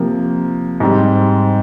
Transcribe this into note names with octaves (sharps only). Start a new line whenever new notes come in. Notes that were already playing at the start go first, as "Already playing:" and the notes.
Already playing: C3 F3 A#3
G#2 G3 C4